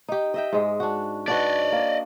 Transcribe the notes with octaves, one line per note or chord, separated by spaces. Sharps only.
D#4 G4
D#5 E5 G5
G#2 G#3
D4 F#4
D4 F#4 B4 D5 D#5
A#3